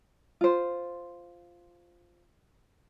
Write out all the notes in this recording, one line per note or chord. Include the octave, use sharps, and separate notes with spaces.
F4 C5